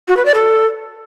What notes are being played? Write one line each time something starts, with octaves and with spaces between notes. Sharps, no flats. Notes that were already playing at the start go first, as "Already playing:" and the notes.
F#4
B4
D5
A4